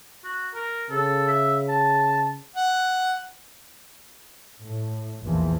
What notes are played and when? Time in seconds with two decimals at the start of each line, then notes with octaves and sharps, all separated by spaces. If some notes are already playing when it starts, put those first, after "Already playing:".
0.24 F#4
0.54 A#4
0.90 C#3 A4
1.28 E5
1.69 A5
2.56 F#5
4.61 A2
5.23 A#1 E2 E3 F3